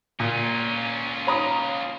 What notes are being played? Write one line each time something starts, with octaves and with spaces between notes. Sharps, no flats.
A#2 C#4 F4
C#5 A#5 D#6